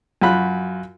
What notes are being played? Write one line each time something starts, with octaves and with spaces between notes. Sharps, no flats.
F#2 F4 F#4 B5 F#6